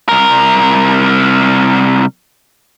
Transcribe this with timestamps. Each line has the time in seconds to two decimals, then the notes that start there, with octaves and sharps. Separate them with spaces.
0.08 C2 A#4